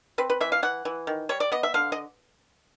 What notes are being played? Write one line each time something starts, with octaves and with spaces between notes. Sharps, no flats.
C4 B4
B4
E3 E5
F5
E3 F#5
E3
D#3
G3 C#5
D5
B3 D#5
E5
D3 F5
D#5